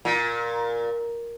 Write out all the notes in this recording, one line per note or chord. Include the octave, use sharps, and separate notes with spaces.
A#2